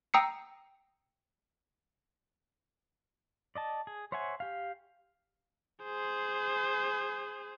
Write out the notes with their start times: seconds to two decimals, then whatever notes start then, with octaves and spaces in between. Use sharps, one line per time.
0.14 G5 A#5 D#6 E6 C7 C#7
3.55 D5 D#5 A5
3.87 G#4
4.12 C5 C#5 E5 F#5 G#5
4.40 G4 F5
5.85 G#4 C5